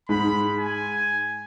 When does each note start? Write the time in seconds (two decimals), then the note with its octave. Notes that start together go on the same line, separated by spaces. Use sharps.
0.09 G#2 G#3 B5
0.59 G#5